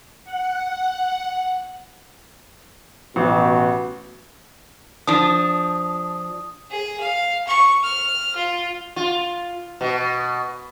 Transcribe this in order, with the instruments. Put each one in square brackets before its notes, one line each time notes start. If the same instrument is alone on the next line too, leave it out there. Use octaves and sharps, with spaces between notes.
[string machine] F#5
[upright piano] A1 [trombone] B2
[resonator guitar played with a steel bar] F3 D4 [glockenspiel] D#6
[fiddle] G#4
F5
C#6
F6
F4
[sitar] F4
B2